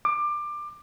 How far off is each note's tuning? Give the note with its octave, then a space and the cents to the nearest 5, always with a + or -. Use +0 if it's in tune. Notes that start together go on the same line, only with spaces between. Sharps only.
D6 +20